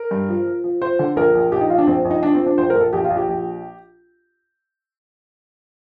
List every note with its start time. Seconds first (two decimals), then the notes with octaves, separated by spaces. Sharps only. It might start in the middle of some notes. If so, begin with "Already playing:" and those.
Already playing: A#4
0.11 G2
0.29 F3
0.46 F3
0.64 F3
0.81 F3 C5
0.99 D3
1.16 A#1 A#4
1.35 A#1
1.52 A#1 G4
1.61 D#4
1.70 F3 F4
1.78 D4
1.87 A#1 C4
2.05 A#1
2.11 D#4
2.23 F3 D4
2.35 C4
2.40 F3
2.46 D4
2.58 A#1 C5
2.70 A#4
2.75 A#1
2.81 A4
2.93 A#1 G4
3.04 F4
3.10 A#1
3.17 G4
3.29 A#1